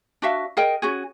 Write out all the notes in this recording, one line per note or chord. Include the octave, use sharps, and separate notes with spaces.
D4 F#4 E5 F5
G#4 A#4 D#5 G5
C#4 F#4 G#4